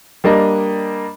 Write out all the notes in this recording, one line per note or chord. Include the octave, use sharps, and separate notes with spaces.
G3 A#3 D4 D#5